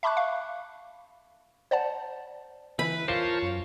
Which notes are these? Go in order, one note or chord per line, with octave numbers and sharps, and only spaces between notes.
E5 A5 B5 C#6 D6 F#6
F5
C5 D5 F#5 A5
E3 B4 B5
F4 A#4 C5 C#5 A5 C7 G7
F#2